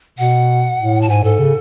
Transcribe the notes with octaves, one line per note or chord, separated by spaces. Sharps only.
B2 F#5
A2
A5
G#2 G#5
G#2 A4
C#3